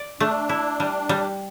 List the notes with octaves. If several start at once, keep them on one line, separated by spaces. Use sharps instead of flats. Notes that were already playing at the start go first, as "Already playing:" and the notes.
Already playing: D5
A3 D4
E4
G3
G3